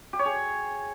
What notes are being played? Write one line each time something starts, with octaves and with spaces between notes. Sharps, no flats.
G4
C#5
G#4